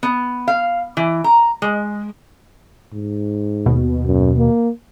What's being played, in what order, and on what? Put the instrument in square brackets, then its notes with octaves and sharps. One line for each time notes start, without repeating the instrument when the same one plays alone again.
[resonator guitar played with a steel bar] B3
F5
E3
A#5
G#3
[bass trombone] G#2
[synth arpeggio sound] D#2 B2
[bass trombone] F#2
A#3